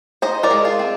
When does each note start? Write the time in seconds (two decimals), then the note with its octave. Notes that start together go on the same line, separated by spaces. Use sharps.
0.22 D#4 C5 D#5
0.43 A#4 D5
0.51 G#3
0.65 F4
0.79 C4